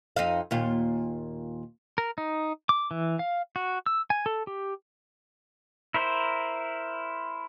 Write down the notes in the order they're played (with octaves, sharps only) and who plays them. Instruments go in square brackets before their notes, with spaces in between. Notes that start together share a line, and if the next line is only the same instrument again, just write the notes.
[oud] F2 D#4 F5
D#2 A#2 F4
[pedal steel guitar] A#4
D#4
D6
E3
F5
F#4
E6
G#5
A4
G4
E4 A#4 C5